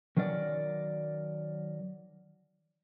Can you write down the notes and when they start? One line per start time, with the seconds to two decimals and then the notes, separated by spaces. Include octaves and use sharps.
0.17 D#3 F#3 C#4 A#4 D5